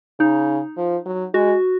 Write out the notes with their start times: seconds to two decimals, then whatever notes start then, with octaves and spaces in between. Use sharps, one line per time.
0.19 C#3 D#4
0.77 F3
1.06 F#3
1.34 G#3 F#4